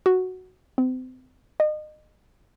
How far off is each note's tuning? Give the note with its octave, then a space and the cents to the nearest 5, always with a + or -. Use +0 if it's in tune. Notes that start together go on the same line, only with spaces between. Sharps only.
F#4 +0
C4 -35
D#5 -30